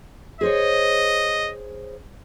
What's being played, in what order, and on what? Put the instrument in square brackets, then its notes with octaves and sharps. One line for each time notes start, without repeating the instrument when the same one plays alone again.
[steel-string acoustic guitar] G#4 C5 C#5 [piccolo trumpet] D#5